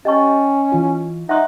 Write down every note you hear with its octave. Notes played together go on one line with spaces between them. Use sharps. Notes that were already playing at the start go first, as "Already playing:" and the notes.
C#4 G4 D#5 G5 A5 C#6
E3 F4
D#4 E5 F#5 C6 D#6 F#6